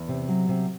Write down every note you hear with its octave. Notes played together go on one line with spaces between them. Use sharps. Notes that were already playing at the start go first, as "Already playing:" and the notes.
Already playing: E2
C3
F#3
C3